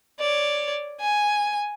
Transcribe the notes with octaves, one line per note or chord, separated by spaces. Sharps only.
C#5 D5
G#5